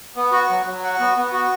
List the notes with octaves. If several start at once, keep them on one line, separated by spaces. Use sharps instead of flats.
B3
F#4
F#3
F#3
F#4
B3
B3
F#4